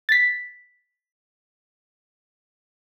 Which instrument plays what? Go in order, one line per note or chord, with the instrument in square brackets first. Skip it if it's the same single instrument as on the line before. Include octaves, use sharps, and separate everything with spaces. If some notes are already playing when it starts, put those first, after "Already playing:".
[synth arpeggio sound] A6 B6